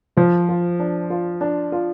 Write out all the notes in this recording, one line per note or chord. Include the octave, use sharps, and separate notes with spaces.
F3 F4
F4
D4
F4
D4
F4